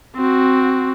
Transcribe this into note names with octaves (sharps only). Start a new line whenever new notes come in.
C4 F#4